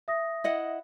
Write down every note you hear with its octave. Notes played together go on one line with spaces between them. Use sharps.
E5 D#6 A#6
E4 D#5 F#5